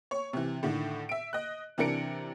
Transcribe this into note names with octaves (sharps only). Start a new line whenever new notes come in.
C#5 C#6
C3 E3
A2 D3 D#3
E5 D7
D#5 F#6
C3 E3 D4 A#4 C#7 D7